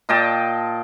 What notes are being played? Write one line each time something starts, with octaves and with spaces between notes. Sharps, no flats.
A#2 D#5 G5 A5